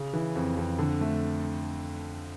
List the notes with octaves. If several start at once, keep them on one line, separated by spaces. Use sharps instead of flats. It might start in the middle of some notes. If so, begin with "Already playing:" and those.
Already playing: C#3
E3
F2
F2
D3
A3